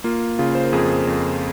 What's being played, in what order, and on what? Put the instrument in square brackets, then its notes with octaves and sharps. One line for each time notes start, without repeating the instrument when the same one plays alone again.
[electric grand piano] A#3 F4
C#3 F4
C5
A#4
F2 G#4
F2